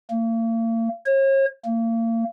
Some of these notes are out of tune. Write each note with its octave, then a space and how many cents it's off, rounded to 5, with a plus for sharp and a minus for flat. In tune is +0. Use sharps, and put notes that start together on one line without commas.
A#3 -40
C#5 -40
A#3 -35